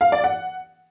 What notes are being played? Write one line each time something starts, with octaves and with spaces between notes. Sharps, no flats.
F5
D5
F#5